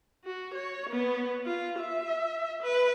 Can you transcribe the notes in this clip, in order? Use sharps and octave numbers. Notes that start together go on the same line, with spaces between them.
F#4
C#5
B3
F4
E5
B4